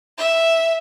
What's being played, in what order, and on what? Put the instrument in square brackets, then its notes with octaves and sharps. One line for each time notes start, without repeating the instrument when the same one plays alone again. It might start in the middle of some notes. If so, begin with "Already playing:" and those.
[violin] E5